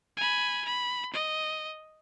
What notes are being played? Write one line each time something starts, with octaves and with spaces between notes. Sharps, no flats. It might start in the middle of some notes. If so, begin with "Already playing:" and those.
G#5 B5
B5
D#5